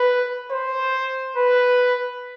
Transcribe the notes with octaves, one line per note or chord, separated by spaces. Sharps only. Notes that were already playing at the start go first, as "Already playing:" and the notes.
Already playing: B4
C5
B4